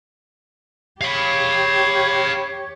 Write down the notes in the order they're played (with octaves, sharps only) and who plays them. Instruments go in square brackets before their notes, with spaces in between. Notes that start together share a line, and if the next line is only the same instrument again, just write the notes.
[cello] G4 C#5 [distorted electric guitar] F5 B5